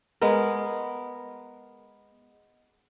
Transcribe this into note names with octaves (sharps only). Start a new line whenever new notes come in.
G#3 B3 A#4